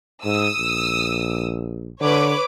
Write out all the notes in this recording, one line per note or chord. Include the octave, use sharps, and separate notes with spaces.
G#2 D#6 E6
A#1
D3 B4 C#5 D6